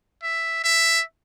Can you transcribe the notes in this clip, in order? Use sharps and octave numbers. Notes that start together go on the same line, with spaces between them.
E5
E5